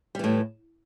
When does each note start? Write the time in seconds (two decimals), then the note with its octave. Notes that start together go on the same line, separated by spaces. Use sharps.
0.15 G3
0.19 E3
0.24 A2